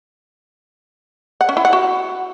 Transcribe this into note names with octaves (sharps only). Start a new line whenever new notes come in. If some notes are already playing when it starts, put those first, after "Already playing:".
F#5
C#4
E4
F#5
F#4